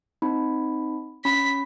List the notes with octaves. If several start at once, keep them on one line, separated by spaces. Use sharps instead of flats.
C4 D#4 B5
C#4 B5 B6